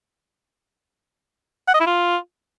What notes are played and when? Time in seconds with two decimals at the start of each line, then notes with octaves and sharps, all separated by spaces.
1.68 F#5
1.74 D#5
1.80 E4
1.87 F4